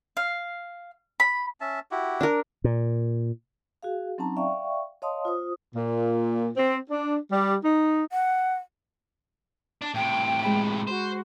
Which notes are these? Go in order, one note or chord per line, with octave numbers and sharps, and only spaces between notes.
F5
B5
C#4 E5 A5
E4 F#4 G4
D4 A#4
A#2
F#4 G#4 F5
F#3 C4 C#4 D#4 A5 A#5
D5 E5 F5 G5 C#6
C#5 D#5 F5 A5 C6 D#6
F4 C5 D#6
A#2
C4
D4
G3
D#4
F#5
D4
A2 C3 G5
G#3 B5
F#4 C5